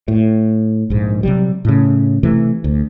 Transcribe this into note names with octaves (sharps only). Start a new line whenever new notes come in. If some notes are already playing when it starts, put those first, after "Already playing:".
A2
A#1 G#2
C3 F#3 G3
A2 C#3
C3 E3 A3
D2